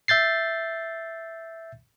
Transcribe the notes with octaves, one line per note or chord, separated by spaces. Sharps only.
E5 G6 A6 C7